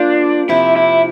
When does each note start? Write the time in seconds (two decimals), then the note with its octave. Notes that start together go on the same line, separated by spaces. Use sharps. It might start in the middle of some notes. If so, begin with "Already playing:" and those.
Already playing: A#3 D4 F4 C5
0.49 C3 F3 C4 E4
0.76 E4